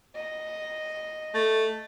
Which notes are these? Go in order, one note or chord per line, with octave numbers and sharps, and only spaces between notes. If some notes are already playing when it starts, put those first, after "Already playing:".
D#5
A3